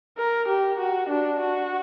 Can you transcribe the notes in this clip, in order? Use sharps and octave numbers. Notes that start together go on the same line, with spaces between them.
A#4
G4
F#4
D4
F#4